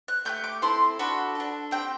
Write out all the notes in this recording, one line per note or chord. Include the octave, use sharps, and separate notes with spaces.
F#6
A3 E4 G4 G6
D6
C4 E4 A4 C6
D4 F#4 A4 B5
D4 A4
C4 G4 G5